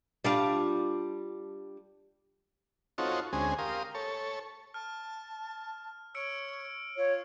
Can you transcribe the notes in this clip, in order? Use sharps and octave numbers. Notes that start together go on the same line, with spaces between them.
G3 D4 F4
C4 D#4 F4 F#4 A4 C#5
D2 G#3 C4 C#4 G#4
G4 A#4 F5 C6 D#6
A4 C#5
A5 F6
C#5 E6 C#7 D7
F4 C#5